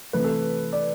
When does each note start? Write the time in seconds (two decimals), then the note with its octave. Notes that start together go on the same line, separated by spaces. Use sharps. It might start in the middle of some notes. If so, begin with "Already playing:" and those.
0.13 C3 E3 A3 B4
0.24 A4
0.73 D5